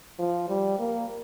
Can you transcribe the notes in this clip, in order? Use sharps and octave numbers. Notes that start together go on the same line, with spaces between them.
F3
G3
A#3